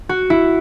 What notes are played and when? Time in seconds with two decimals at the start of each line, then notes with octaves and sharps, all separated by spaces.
0.09 F#4
0.30 E4